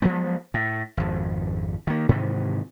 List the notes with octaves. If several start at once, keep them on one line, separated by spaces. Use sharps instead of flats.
F3 F#3 G#3 B3
A2
G#1 F2
D#3 A#3
G#2 C3 D#3 E3